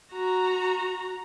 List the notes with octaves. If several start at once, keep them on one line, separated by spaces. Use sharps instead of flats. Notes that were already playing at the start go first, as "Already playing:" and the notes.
F#4 A#5